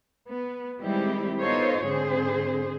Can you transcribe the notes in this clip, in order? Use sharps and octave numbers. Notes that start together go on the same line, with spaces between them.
B3
D#3 G3 G#3 C4 E4 G4
B3 D#4 F4 A4 C5 C#5
G#2 D3 C4 G#4 C5